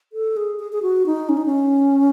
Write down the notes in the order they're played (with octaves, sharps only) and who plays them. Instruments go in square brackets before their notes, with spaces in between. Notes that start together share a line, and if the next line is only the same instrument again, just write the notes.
[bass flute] A4
G#4
G#4
G#4
F#4
D#4
C#4
D#4
C#4